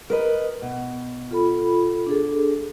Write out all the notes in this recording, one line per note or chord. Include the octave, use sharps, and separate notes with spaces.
A#4 B4 D#5
B2
F4 A4 B5
D4 G#4 A4